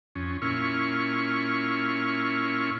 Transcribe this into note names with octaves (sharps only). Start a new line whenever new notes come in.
F2 C#4
A#2 C#4 E4 F4 C#6 F6